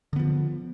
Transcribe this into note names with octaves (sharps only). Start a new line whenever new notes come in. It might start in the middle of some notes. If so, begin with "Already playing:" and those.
D3 F3 B3